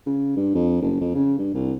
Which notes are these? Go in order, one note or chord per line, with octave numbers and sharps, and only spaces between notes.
C#3
G2
F2
F#1
F2
C#3
G2
C2